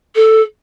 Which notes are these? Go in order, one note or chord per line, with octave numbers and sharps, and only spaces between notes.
A4